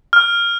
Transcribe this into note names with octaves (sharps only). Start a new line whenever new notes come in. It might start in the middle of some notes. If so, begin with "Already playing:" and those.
F6